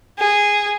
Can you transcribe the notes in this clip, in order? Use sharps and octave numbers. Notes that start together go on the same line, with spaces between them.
G#4